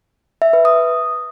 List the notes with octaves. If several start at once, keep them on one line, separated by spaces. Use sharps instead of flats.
E5
B4
D#6